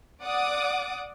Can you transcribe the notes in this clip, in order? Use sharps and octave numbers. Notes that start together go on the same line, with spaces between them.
D5 F#5 D6 D#6